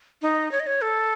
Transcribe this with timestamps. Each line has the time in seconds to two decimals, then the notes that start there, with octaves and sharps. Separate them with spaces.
0.22 D#4
0.52 C#5
0.60 D#5
0.67 C#5
0.82 A4